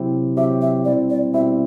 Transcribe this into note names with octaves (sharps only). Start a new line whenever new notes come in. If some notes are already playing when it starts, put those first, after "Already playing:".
Already playing: C3 F#3 C4 E4 G4
C3 F#3 C4 E4 G4 E5
E5
B2 G3 C4 E4 D5
D5
B2 G3 C4 E4 E5